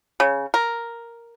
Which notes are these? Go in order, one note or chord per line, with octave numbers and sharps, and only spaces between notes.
C#3
A#4